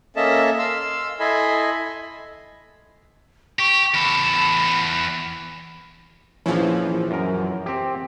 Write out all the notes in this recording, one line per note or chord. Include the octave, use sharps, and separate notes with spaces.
A#3 C#4 A4 D#5 E5 A5
F5 C6 E6
E4 A4 D#5 G#5 B5 C6
G4 C#6
E2 A4 B5
A#1 E3 F3 C#4
F#2 A#4
C4 G4